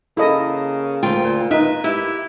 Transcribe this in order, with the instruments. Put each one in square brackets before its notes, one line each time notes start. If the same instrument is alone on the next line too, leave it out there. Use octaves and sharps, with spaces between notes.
[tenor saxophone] C#3 [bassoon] A#3 [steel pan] E4 A4 D#5
[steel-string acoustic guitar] D2 F4 G5
[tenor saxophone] A#2
[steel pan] D#4 [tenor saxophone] B4 [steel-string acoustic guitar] E5
[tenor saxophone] E4 [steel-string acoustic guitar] G4